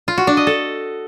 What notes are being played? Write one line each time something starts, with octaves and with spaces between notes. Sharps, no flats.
F4
F#4
D4
D#5
A4